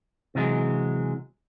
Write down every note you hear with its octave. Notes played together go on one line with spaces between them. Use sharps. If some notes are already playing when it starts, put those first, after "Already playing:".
C3 E3 F#3 G#3